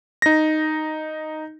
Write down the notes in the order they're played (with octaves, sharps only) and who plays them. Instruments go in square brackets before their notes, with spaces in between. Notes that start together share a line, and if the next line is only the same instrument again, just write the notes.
[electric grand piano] D#4 A#6